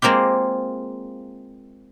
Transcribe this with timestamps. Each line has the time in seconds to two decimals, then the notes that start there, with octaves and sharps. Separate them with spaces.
0.02 G#3 A#3 C4 F4 G4